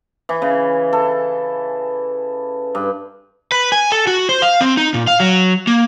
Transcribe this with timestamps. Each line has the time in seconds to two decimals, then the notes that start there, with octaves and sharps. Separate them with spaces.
0.29 E3
0.42 C#3
0.93 A4
2.75 G2
3.52 B4
3.72 G#5
3.92 A4
4.07 F#4
4.29 C5
4.42 F5
4.61 C4
4.77 D#4
4.94 A#2
5.07 F5
5.20 F#3
5.67 A#3